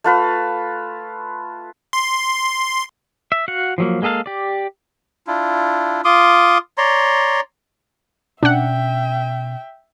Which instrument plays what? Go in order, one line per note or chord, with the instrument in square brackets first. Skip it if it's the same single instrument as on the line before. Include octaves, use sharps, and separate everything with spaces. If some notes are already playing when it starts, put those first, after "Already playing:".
[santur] A3 F4 B4
[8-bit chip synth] C6
[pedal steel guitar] E5
F#4 F5 F#5
F3 F#3 A#3
G#3 A#3 G#4 A4 F5
G4 D5
[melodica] D4 E4 F4
F4 C6 D6 D#6
C#5 D5 A#5 C6
[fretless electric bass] B2 C#4 [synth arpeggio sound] D4 F#5 [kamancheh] E5 G5